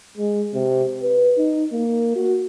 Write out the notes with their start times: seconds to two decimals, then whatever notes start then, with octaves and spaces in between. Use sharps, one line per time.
0.17 G#3
0.54 C3
1.02 B4
1.38 D#4
1.72 A#3
2.15 F#4